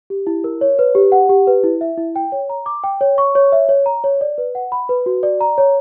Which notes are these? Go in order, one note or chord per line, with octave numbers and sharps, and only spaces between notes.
G4
E4
A#4
C#5
B4
G4
F#5
G4
B4
E4
E5
E4
G5
C#5
A#5
D6
G5
C#5
C#6
C#5
E5
C#5
A#5
C#5
D5
B4
F#5
B5
B4
F#4
D5
A#5
C#5